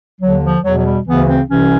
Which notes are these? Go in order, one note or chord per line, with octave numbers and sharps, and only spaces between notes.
D#2 D3 F#3
F3
E2 B2 F#3
F#3
G3
D2 C#3 E3 B3
C4
C2 C3 E3 C#4